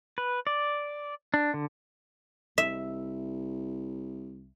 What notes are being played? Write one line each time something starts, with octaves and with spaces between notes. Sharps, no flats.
B4
D5
D4
D3
C2 E5